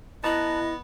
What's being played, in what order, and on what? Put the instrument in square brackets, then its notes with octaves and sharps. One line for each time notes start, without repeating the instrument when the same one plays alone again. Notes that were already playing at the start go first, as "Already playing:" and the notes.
[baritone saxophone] B3 [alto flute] E4 [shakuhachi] D#5 [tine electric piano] A5 A#5 F#6